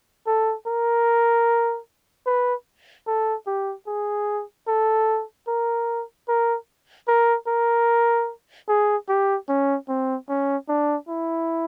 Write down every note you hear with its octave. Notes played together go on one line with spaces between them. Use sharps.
A4
A#4
B4
A4
G4
G#4
A4
A#4
A#4
A#4
A#4
G#4
G4
C#4
C4
C#4
D4
E4